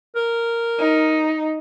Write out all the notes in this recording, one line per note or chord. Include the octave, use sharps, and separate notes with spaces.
A#4
D#4